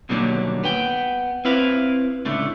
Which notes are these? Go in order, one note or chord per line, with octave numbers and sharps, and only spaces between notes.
B2 D3 D#3 F#3 G3 A#3
B3 G5
C4 E4 B4 F5
C#2 A2 D3 A3